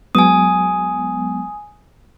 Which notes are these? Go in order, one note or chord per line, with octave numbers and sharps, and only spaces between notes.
F#3 G#3 B3 G#5 D#6